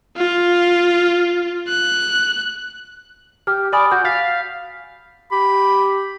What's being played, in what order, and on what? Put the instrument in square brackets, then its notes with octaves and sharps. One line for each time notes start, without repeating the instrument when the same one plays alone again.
[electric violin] F4
F#6
[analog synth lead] G4 [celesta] F6
[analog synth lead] D5 [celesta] G#5 B5 D#6
[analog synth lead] F#4 [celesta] G6
[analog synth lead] F5 [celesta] A6 B6
[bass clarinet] G4 [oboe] B5